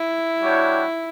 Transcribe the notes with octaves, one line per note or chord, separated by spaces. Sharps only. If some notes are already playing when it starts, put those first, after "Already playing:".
Already playing: E4
G3 D4 F#4 C#5 G5